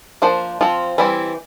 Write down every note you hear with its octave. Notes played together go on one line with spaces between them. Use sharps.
F3 A#3 D4 C5
F3 C4 F4
E3 G3 C4 E4